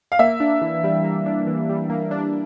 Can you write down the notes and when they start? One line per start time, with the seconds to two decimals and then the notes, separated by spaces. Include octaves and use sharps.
0.12 F5
0.19 A#3 E5
0.40 D4
0.61 E3
0.84 G3
1.04 A#3
1.26 D4
1.47 E3
1.69 G3
1.90 A#3
2.11 D4